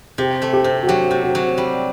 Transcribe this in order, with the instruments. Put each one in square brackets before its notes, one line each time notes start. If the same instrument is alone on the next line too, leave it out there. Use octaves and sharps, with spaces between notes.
[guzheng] C3 [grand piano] G4
[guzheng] A3
[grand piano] G4
[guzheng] C3
[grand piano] F#4
[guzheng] F#3 [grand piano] G4
[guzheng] C3
[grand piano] F#4
[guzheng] F#3
G3